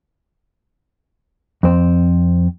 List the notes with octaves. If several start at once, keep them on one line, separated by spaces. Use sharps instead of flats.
F2 C4